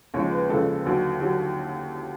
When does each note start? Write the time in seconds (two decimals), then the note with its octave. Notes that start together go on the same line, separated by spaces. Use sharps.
0.14 D#2 C#3 F3 G#3 C#5
0.32 B4
0.49 D#2 C#3 F3 G#3 A4
0.85 D#2 D3 F#3
1.20 D3 F#3 G4